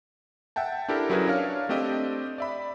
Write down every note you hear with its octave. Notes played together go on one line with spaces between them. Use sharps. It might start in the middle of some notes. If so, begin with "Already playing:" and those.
E5 F#5 G5 A5
D4 E4 G4 A4 A#4
F#3 C#4 E4 G#4 A#4 B4
D4 C#5 F5 F6
A3 C4 D4 G4 D#5
D5 E5 B5